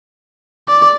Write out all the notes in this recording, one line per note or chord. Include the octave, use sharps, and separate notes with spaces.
D5